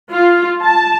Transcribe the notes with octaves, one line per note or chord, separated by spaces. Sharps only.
F4
A5